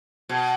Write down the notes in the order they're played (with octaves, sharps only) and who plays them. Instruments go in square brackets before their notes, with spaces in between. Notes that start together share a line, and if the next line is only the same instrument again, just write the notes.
[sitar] B2